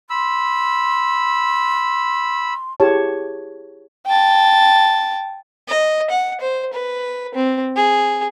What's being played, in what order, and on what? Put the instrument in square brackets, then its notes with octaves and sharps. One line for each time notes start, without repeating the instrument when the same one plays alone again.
[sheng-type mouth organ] B5 E6 [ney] C6
[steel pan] E4 G4 G#4 C#5 A5
[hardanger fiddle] G5 A5
D#5
F#5
C5
B4
C4
G#4